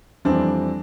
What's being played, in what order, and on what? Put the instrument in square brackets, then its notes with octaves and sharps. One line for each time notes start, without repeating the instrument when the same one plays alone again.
[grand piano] F2 E3 G3 C4 [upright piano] D4